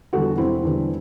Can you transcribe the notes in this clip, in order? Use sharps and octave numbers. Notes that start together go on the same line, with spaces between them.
E2 D3 G3 F#4 A4
E1 C4 E4
E2 D3 G3